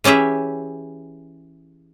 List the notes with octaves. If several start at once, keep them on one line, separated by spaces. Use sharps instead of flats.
E3 C#4 G4 G#4 E5